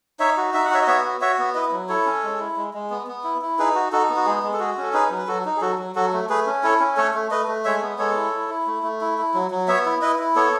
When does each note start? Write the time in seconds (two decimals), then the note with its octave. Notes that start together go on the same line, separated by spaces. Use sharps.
0.20 D#4 C#5 E5
0.37 F#4
0.54 D#4 E5
0.65 F#5
0.71 F#4 C#5 E5
0.82 D#5
0.87 B3 C#5 E5
1.04 F#4
1.21 F#4 C#5 E5
1.39 B3
1.55 E4 B4 D#5
1.72 F#3
1.89 E4 A4 C#5
2.06 C#4
2.24 G#3
2.40 E4
2.57 G#3
2.74 G#3
2.90 B3
3.07 B3
3.24 E4
3.42 E4
3.59 D#4 G#4 B4
3.75 F#4
3.92 D#4 F#4 A4
4.10 B3
4.17 F#4
4.26 G#3 G#4
4.43 G#3
4.53 A4
4.60 F#4 G#4
4.78 C#4 A4
4.93 D#4 G#4 B4
5.10 F#3
5.18 B4
5.28 F#3 F#4 A4
5.45 D#4
5.57 G#4
5.61 F#3 F#4 A4
5.79 F#3
5.96 F#3 F#4 A4
6.13 A3
6.30 A3 G#4 B4
6.47 C#4
6.63 E4 A4 C#5
6.80 C#4
6.97 A3 A4 C#5
7.14 A3
7.31 A3 B4 D#5
7.48 A3
7.65 G#3 C#5 E5
7.82 B3
7.99 G#3 A4 C#5
8.17 E4
8.33 E4
8.49 E4
8.67 A3
8.83 A3
9.01 E4
9.18 E4
9.35 F#3
9.51 F#3
9.68 B3 C#5 E5
9.86 E4
10.02 E4 B4 D#5
10.19 E4
10.36 B3 A4 C#5